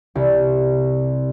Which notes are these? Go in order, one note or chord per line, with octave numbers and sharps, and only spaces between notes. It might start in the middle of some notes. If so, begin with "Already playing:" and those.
C2